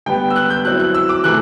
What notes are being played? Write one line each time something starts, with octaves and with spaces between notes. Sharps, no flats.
D3 G3 B3 G5
E6
F#6
G6
F#3 C4 E4 F#6
F#6
E6
D6
C3 E3 A3 F#6